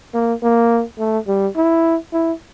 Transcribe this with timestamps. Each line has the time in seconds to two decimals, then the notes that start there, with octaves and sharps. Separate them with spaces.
0.14 A#3
0.43 A#3
0.99 A3
1.27 G3
1.56 E4
2.13 E4